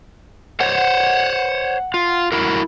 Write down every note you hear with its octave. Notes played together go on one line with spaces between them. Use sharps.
C5 C#5 F#5
F4
E4 F#4 A#4